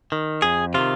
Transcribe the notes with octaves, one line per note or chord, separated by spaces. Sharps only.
D#3
F2 G#4
C3 D#3 F4